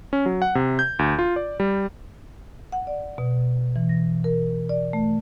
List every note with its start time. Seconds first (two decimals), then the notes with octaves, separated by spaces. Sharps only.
0.13 C#4
0.26 F#3
0.42 F#5
0.55 C3
0.79 G6
0.99 D2
1.19 F4
1.36 D5
1.60 G3
2.72 F#5
2.87 D5
3.18 B2
3.76 E3
3.89 A#6
4.24 A#4
4.69 D5
4.93 A3